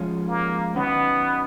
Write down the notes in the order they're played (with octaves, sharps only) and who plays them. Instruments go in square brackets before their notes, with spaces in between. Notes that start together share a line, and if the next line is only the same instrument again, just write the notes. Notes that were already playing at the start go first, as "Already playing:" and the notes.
Already playing: [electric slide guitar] F3 G#3 C#4 F4
[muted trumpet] A#3
[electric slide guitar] D#3 F#3 C#4 [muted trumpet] B3